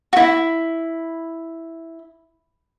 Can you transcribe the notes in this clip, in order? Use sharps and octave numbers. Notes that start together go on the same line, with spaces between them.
E4 F#4